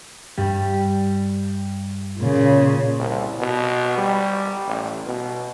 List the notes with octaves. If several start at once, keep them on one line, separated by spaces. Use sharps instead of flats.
G2 G3
A#2 C#3
C2
B2
G3
A1
B2